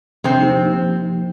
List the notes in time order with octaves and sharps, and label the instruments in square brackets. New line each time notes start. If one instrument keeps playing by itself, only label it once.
[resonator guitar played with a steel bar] C3 C4 [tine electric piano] F3
[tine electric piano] A#3 D#4 G4
F3